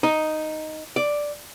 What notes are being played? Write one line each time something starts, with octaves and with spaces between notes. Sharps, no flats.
D#4
D5